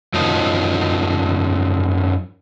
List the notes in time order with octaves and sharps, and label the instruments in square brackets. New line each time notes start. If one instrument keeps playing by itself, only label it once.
[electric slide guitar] F#2 F3 D#4